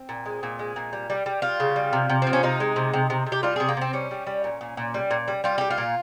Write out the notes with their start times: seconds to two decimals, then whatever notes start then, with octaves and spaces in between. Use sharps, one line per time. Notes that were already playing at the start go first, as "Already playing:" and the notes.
Already playing: C4
0.09 A#2
0.25 G#3
0.43 A#2
0.59 G#3
0.76 A#2
0.93 G3
1.10 G3
1.26 G3
1.42 G3 F4
1.60 C#3
1.76 G3
1.93 C3
2.09 C3
2.22 F3 C4
2.33 C#4
2.43 C3 D#4
2.60 G#3
2.76 C3
2.93 C3
3.10 C3
3.26 C3
3.32 G4
3.43 G3 F4
3.56 C3 G#4
3.69 A#3
3.77 C3 C4
3.93 G3 C#4
4.11 G3
4.27 G3
4.44 A#2
4.61 A#2
4.77 A#2
4.94 G3
5.11 A#2
5.28 G3
5.44 G3 F4
5.58 G3 G4
5.70 F4
5.78 A#2